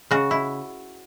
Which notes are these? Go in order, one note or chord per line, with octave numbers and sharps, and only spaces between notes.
C#3 F#4
E4